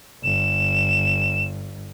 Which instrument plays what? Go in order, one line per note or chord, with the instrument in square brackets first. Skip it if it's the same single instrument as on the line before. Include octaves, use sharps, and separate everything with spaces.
[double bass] G1 [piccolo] E7